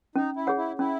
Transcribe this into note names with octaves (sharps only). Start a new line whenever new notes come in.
C#4 D#4
E4
G#4 C#5 F#5
E4
C#4 E4